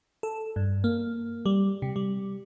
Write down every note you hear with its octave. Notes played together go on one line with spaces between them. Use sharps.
A4
G2
A#3
G3
C3
G3